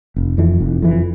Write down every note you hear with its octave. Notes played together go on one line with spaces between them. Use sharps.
F1
F2 E3
F1
F2 E3